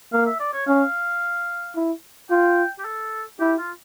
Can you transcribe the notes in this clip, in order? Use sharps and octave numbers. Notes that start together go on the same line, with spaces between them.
A#3 F5
E5
D5
C#5
C#4 F5
E4
F4 G5
G4
A4
E4 G4
F4